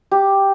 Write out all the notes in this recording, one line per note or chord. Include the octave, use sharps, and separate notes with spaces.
G4